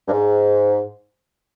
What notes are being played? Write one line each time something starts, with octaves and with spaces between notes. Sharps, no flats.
G2
G#2